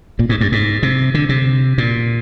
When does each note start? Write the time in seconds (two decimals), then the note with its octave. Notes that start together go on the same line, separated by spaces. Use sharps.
0.19 A#2
0.29 G#2
0.41 G2
0.52 G#2
0.83 C3
1.14 D3
1.29 C3
1.78 A#2